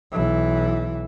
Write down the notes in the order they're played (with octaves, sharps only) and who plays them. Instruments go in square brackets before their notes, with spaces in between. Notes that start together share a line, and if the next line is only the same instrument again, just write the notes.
[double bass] B1 E3